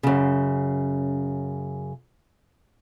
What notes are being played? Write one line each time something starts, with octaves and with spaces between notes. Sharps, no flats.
F#2 C#3